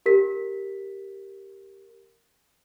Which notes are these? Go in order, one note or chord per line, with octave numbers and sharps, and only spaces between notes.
G4 A#4 B6